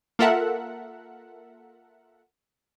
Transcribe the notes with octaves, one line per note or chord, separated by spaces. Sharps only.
A#3 F4 A4 A#4 E5 F#5